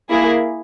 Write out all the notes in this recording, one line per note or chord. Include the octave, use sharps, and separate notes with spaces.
A#3 E4 G#4